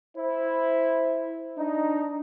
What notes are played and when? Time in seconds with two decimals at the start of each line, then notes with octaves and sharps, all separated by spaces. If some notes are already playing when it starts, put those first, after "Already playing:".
0.17 E4 C5
1.58 D4 D#4